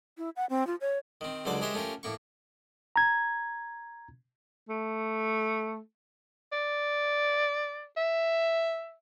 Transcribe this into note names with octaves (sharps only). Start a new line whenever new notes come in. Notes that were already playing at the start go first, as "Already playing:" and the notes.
E4
F#5
C4
F4
C#5
D#3 C4
C#2 D3 F#3 C5 D5 D6
G#3 G4 A#4 C5 C#5 E5
A3 C#4 F4 G4 A#4
A2 A#3 C#6
A#5 G#6
A3
D5
E5